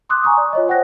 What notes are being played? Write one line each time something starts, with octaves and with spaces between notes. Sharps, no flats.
C6 D6 D#6 F#6
G#5 A#5 C#6 D#6
D5
F4 C#5 D#5
C5 F#5 G5 F#6 A#6